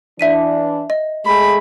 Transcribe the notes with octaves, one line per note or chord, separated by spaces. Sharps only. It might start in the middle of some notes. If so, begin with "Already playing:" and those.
E3 D4 E5 B6 D#7
D#5
G#3 A3 G#4 B5